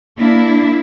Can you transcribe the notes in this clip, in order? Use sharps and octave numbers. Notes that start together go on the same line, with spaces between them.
A#3 D4 E4